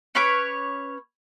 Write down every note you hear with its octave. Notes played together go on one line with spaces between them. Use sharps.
C#4 B4 C#5 D6